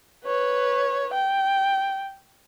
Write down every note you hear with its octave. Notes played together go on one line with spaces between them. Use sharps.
B4 C#5
G5